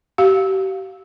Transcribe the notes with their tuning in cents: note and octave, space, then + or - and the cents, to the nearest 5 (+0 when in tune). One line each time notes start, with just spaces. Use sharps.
G4 -40 F5 +5